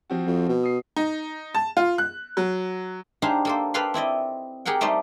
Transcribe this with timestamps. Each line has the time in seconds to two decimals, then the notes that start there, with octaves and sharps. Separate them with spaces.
0.10 F3 C4 F#4
0.27 F2
0.49 B2
0.63 D#6 C7
0.96 D#4
1.55 A5
1.77 F4
1.98 F#6
2.37 F#3
3.22 D4 D#4 G4 G#4 C5 F5
3.45 A#3 A4 C5
3.74 A4 B4 D5 F5 G5 C6
3.94 C4 E4 D5 D#5
4.65 G4 G#4 A#4 F#5 G5
4.81 G3 A3 D#4 C5 D5